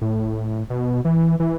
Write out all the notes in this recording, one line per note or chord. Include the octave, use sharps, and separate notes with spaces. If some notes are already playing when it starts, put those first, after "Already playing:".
A2
B2
E3
E3